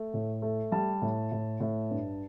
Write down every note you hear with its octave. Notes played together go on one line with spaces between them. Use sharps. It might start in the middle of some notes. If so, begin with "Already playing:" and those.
Already playing: A3
A2
A3
G3 A5
A2
A2
A2
G2